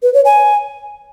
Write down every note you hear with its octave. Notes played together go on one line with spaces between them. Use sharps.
B4
C#5
G#5